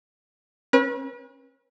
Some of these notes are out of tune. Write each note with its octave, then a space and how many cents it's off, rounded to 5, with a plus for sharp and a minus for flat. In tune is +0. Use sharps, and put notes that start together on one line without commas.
C#4 -40 B4 -40